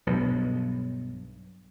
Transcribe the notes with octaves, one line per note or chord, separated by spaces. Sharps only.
B1 G2